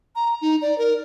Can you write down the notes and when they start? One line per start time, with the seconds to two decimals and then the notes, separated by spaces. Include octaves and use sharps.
0.16 A#5
0.42 D#4
0.62 D5
0.78 A#4